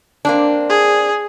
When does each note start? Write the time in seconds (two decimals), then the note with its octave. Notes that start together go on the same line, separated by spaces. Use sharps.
0.25 A#3 C4 D4
0.70 G#4